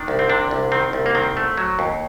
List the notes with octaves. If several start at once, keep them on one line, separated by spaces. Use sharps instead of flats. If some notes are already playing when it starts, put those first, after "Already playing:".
Already playing: D#3 D4
C2
C4
C3 D4
C2
D#3 C4
C2
A#3
D#3 C4
A3
F#3
D#2